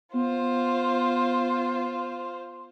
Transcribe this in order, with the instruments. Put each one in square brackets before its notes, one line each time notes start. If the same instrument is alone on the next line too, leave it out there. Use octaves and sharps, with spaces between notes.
[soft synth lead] B3 [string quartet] F4 C5